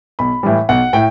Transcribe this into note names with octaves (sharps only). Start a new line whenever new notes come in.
B1 B5
A2 E3 G3
B1 F#5
A2 G5